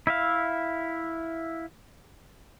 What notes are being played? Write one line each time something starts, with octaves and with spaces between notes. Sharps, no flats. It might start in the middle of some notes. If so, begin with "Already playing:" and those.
E4 E5 F5